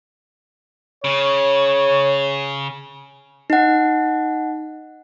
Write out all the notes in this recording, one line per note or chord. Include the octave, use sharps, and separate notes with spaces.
C#3 C#5
D#4 F#5